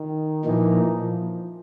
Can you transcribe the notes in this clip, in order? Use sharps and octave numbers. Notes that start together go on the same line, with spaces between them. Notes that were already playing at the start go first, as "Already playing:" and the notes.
Already playing: D#3
A#2 E3 F3 A#3 D#4
F3